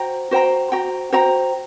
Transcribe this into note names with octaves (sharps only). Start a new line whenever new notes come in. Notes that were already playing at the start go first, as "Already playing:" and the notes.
Already playing: F#4 C5 G5 A#5
F#4 C5 G5 A#5
F#4 C5 G5 A#5
F#4 C5 G5 A#5